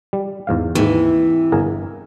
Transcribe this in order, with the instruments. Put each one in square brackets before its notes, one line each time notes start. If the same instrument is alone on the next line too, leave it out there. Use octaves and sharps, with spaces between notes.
[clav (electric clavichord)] G3
E2 G#2 F5
[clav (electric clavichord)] D#2 G#2 [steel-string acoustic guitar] C3 E3
[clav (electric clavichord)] G1 G#4 A#4